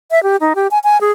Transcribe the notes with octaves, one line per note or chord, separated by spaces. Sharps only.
E5
G4
D#4
G4
G#5
G#5
G#4